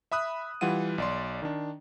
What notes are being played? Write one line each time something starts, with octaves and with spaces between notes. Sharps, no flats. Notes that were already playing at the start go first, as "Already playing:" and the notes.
E5 B5 D#6 F#6
E3 G3 F4 F#5 D#7
B1 D5 C6
D#3 D4